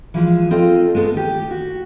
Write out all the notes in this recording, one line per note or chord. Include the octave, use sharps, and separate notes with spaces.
E3 F3 G#3
C4 F4 A4 D#5
G#3 A3 B3 A4
D#2 G4
F#4